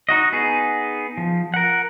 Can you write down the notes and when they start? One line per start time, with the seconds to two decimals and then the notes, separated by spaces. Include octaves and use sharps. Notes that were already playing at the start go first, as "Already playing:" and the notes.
0.09 D#4 F#4 D#5
0.33 B3 D#4 G#4
1.18 F3
1.54 A#4 F#5